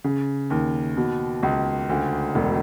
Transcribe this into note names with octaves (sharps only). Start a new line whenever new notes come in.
C#3
D#2
B2
C#2
D2
E1